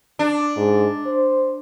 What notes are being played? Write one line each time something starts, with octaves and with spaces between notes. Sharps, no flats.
D4
G#2
C5